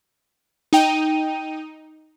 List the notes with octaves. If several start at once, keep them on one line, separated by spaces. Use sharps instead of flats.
D#4 G5 D#7